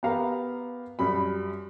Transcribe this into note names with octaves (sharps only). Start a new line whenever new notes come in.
B3 G4 A#4 F5 A#5
F#2 G3 B5